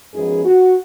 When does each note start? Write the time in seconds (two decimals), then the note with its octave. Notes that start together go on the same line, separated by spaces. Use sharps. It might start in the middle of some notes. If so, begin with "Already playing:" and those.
0.13 F#2 F3 G#3 B3 D#4 G#4
0.44 F#4